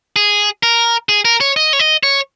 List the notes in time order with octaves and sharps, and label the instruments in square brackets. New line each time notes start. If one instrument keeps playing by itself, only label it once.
[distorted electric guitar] G#4
A#4
G#4
A#4
C#5
D#5
C#5
D#5
C#5